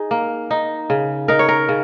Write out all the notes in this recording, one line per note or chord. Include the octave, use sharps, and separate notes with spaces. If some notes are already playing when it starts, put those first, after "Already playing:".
Already playing: D#4 G#4
A#3
D#4
C#3
D#4 A#4
C#5
A#4
C#3